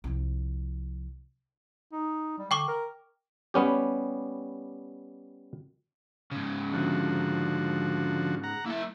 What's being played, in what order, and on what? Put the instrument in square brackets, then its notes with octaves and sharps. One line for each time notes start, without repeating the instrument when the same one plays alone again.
[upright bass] C2 F3
[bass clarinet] D#4
G3
[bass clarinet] D3 [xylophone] G5 C#6 D6
[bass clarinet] A#4
[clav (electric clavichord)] G3 B3 C#4 G4
[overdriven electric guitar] G#2 C#3
[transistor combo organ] D3 F3 F#4
F#5 A#5
[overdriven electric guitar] A#3 E5 [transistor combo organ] E4